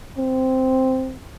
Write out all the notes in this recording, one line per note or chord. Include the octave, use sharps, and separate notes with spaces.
C4